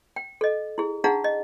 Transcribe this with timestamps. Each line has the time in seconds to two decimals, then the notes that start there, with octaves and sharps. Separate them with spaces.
0.16 G5
0.41 A4 D#5
0.78 E4 G#4
1.04 D4 D#4 G#4 F5 F#5 A#5
1.24 D#5